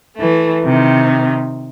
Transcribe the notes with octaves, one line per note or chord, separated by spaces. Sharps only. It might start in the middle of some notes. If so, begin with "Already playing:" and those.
E3 A3
C3 D#3